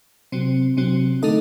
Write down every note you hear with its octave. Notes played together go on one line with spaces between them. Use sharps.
C3 F#3 C4
C3 F#3 C4
D3 A3 D#4 A4 D#5